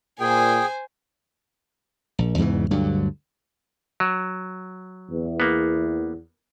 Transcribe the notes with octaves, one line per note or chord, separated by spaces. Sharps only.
A#2 G#4 C5 G5 G#5
A#1
E2 G#2 C#3 E3
D2 G2 D3 F#3
F#3
E2
A#3 B3